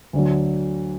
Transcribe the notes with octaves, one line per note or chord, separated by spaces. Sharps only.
D2 D3 F#3